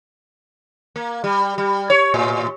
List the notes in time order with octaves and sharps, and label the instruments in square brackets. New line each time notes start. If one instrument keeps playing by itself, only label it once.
[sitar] A#3
G3
G3
C#5
A2